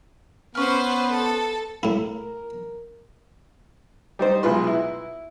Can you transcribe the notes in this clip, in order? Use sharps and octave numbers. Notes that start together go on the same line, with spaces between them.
B3 C#4 B4 C5 F6
A4
A2 E4 A#4
G3 D#4 C5
B1 G#3 F4 B4 C6
E4